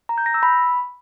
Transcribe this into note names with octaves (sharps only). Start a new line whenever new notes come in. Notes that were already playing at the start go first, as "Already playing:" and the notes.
A#5
G6
A#6
E6
B5